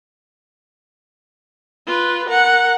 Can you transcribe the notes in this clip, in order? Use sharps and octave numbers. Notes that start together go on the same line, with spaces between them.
F4 B4
A#4 F#5